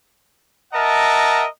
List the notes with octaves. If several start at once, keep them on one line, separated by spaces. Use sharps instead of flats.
A#4 D#5 E5 F#5 A5